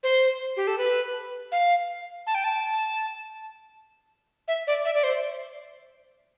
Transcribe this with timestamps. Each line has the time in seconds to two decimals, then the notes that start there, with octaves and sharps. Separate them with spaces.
0.03 C5
0.57 G4
0.67 A4
0.78 B4
1.52 F5
2.27 A5
2.35 G5
2.44 A5
4.48 E5
4.67 D5
4.85 E5
4.95 D5
5.04 C5